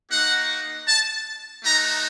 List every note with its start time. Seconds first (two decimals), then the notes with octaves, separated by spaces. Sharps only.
0.11 A#3 D#4 F#4 F#5
0.87 A5
1.64 A3 D#4 F#4 A#5